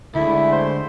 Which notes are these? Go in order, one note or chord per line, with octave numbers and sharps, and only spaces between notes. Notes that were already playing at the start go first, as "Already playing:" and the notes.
D2 D3 G#3 A3 E4
C5